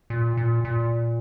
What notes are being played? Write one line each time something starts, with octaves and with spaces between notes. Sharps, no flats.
A#2
A#2
A#2